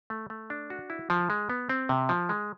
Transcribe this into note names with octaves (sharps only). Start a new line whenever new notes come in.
A3
A3
D4
F#4
E4
F3
G#3
B3
C4
C3
F3
G#3